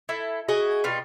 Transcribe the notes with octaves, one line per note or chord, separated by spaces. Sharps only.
E4 A4
E4 F#4 G#4 D#5
B2 G3 F4